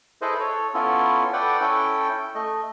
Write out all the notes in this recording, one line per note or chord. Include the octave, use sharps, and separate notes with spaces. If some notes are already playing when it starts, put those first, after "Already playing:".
E4 G#4 A4 B4 C5 D#5
A4 C#5
B3 C#4 E4 F4 A4
A4 B4 D5 F#5 G5
C#4 E4 A4 G5
A3 D#5